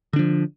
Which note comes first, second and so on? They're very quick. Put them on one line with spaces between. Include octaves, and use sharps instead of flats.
D3 D4 F3